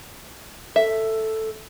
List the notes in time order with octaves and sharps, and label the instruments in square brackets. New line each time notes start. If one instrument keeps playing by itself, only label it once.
[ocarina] A4 [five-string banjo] E5